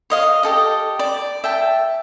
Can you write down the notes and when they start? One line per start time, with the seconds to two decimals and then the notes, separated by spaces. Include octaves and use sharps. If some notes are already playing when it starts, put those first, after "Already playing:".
0.10 C#5 D#5 F5
0.43 G4 A4 D#5
0.99 D5
1.44 E5 G5 A5